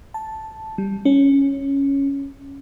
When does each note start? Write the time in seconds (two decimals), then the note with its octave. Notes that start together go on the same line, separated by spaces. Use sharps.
0.14 A5
0.78 G3
1.05 C#4